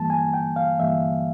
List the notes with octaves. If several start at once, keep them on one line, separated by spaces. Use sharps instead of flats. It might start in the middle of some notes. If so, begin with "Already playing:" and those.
Already playing: G2 E3 G3 A#3 A5
G#5
G5
F5
G2 E3 G3 A#3 E5